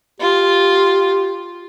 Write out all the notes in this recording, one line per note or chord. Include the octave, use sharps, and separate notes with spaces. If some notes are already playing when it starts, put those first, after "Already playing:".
F4 G4